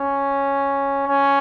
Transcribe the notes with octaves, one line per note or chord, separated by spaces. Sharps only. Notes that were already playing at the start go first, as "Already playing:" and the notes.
Already playing: C#4
C#4